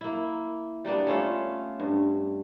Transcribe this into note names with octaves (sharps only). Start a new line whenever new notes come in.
A#3 E4
G3 A#3 B3 D4
A3 C#4 F4 F5
G2